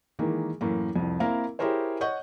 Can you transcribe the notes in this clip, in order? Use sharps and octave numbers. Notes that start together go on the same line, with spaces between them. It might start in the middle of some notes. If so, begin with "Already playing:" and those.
D#3 E3 G#3 A#3
F#2 A2 E3 A#3
C2 F2
A#3 C4 E4 A#4 F5
E4 G4 G#4 A#4 C5 C#5
C#5 D#5 F#5 C#6 G6